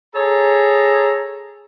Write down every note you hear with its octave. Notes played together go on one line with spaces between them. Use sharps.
G#4 A4 C#5 A#5